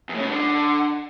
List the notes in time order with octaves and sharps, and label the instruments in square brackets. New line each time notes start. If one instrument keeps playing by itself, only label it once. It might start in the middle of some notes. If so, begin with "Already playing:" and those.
[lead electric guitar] E2
A2
C#3
G2
D3